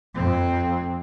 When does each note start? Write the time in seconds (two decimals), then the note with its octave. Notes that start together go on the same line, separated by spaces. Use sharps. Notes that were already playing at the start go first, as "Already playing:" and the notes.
0.15 F2 C4